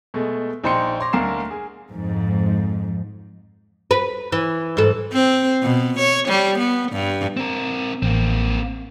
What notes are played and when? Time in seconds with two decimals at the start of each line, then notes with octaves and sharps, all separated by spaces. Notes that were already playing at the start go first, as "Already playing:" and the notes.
0.14 B2 G#3 A3
0.64 A#1 D#4 C5 G5 C6 C#7
1.00 C#5 C6 D6 A#6
1.13 D2 A#3 A#4 C7 E7
1.51 G#4
1.90 F2 G#2
3.91 B4
4.32 E3
4.77 G#2 E3 A4
5.13 C4
5.63 B2
5.99 C#5
6.29 G3
6.59 B3
6.92 G2
7.37 C4 A#4
8.03 A1 A#3 C4